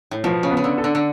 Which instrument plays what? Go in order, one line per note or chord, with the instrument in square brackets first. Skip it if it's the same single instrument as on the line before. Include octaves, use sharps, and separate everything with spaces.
[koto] A2
[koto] B2 [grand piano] F3
[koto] C#3
[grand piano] B3
[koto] C#3
D3
[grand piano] A4
[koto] D3
D3